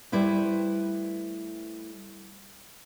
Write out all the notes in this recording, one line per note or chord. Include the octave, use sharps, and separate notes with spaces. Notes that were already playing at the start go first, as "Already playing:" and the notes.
G3 A3 E4 B4 C5